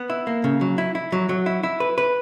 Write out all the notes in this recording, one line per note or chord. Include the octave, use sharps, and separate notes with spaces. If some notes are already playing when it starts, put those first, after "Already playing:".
Already playing: B3
E4
A#3
C#3
F#3
E4
E4
F#3
F#3
E4
E4
B4
B4